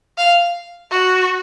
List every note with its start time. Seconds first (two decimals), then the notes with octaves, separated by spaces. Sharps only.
0.18 F5
0.91 F#4